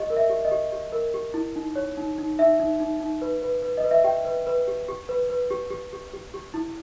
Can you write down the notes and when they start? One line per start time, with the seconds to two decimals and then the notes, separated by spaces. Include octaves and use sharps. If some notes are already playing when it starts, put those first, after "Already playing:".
Already playing: G4 D#5
0.10 A#4
0.17 E5
0.30 G4
0.45 D#5
0.51 G4
0.72 G4
0.92 A#4
1.14 G4
1.34 E4
1.56 D#4
1.76 C#5
1.97 D#4
2.18 D#4
2.38 D#4 E5
2.60 D#4
2.80 D#4
3.00 D#4
3.22 B4
3.42 B4
3.63 B4
3.77 D#5
3.84 B4
3.91 E5
4.04 G4 G5
4.25 B4
4.47 B4
4.67 G4
4.89 G4
5.09 B4
5.30 B4
5.51 G4
5.71 G4
5.93 G4
6.13 G4
6.34 G4
6.54 E4